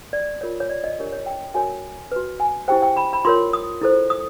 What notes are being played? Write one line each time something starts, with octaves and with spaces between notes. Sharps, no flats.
D5
F4 A#4 C#5
C#5
D5
D#5
D4 G4 A#4 C#5
C#5
G5
F#4 A#4 C#5 G#5
F#4 B4
G#5
E4 G4 C5 G5
G5
B5
B5
F4 A#4 C#5 C6
D#6
E4 A4 C5
D#6